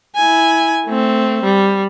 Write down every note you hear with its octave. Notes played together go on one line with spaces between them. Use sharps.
E4 G#5
A3 C4
G3